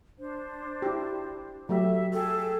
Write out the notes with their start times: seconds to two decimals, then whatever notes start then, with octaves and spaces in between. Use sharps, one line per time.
0.18 D4 C5
0.82 E4 G4
1.69 F#3 A3 G4 E5
2.13 G#4 A4 G5